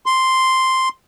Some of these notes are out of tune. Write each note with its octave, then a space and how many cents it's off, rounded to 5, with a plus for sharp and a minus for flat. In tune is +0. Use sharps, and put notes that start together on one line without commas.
C6 +0